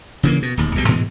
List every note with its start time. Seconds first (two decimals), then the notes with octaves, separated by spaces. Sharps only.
0.23 C#3 E3 A#3
0.42 B2
0.57 D1 D#2
0.75 B1 B2 G3
0.88 G#2 B2 E3 G#3